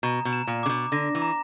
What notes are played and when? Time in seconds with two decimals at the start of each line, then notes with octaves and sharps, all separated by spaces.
0.03 B2 A#5
0.25 B2
0.33 E7
0.47 A#2
0.63 C#3 D6
0.69 B2
0.92 D3 A#6
1.15 E3
1.22 A#5